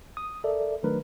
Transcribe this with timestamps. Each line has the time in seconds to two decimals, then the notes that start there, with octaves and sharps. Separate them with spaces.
0.17 D#6
0.44 A4 A#4 D5 E5
0.83 D#3 F#3 A3 D4 A#4 B4